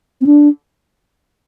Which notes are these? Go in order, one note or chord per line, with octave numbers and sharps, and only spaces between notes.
C4
D4